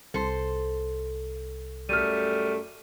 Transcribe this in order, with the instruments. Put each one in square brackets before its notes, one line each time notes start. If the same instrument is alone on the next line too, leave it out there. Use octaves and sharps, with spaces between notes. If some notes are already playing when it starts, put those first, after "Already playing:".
[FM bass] C2 [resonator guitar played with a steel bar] A4 C5
[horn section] F#2 G3 A3 [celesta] F6 D#7